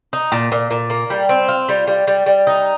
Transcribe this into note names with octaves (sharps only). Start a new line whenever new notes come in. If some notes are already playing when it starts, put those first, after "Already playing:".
D#4
A#2
A#2
A#2
A#3
G3
C4
F4
G3
G3
G3
G3
D#4